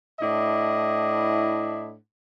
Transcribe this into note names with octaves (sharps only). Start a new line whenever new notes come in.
A2 D4 E4 D#5